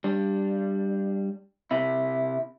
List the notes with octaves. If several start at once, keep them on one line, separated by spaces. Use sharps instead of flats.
G3 D4
C3 E4